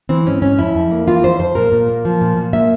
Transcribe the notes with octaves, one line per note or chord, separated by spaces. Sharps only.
E3 C4
G#2 C#4
G#2 C#4
F2 E4
F2
A#3
E3 F4
F2 C5
F2 C5
A#2 A#4
A#2
A#3
F3
A#2
A#2
A#3 E5